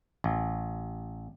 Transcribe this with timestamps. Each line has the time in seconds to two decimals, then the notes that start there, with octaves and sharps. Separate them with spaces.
0.24 A1